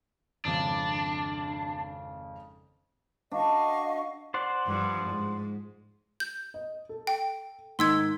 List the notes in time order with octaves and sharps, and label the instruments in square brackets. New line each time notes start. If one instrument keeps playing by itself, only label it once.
[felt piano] G#1 F2 C#3 [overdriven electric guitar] D4
[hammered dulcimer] D4 F#4 [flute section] D#5 F5 C#6
[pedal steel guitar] C5 D5 F#5
[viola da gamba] G2 F3
G#2
[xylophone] G6
[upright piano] D#5
A4
[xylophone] G5
[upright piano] G#2 D#3 B6 [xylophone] C6 E6 G#6